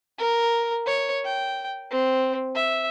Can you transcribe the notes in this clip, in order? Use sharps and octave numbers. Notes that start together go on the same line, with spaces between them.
A#4
C#5
G5
C4
E5